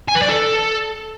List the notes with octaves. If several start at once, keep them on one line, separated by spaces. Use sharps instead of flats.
G#5
B4
D5
A4